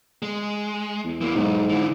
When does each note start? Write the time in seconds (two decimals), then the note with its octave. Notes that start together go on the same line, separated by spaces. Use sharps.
0.22 G#3
1.04 E2
1.21 E3 A#3
1.35 B1 G#2
1.69 D3 E3